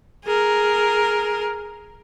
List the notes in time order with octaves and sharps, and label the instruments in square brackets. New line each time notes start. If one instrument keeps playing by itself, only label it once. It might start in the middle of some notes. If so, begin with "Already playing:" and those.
[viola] G#4 A#4